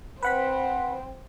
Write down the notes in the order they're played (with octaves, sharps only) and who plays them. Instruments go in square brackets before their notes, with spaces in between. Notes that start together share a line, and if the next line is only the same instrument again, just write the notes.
[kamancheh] C4 C5 [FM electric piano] B4 F#5 B5